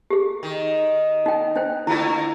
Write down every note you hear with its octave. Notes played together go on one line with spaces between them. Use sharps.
G4 G#4
D#3
D#4 G5
D4 C5 G5
D3 A3 A#3 E4 F4